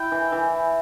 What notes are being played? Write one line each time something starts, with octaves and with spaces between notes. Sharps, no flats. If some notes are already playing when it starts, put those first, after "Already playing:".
Already playing: E4 G5
E3
E3